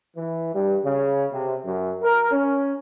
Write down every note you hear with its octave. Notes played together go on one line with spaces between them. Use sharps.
E3
G2
C#3
C3
F#2
A#4
C#4